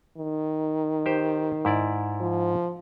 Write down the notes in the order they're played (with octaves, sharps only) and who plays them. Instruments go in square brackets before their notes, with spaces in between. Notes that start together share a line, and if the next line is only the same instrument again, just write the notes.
[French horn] D#3
[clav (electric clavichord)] G4 C5
G#2 E4 D5
[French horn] F3